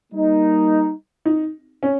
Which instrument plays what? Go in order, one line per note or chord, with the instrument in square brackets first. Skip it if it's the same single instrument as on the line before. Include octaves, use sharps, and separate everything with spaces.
[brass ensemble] G3 A#3 D#4
[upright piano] D#4
C#4